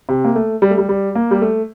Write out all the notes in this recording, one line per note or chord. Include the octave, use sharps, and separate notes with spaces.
C3
A#3
A3
G3
A3
G3
G3
A#3
G3
A3